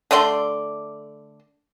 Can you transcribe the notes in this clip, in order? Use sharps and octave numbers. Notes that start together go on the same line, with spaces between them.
D3 A3 D5 C6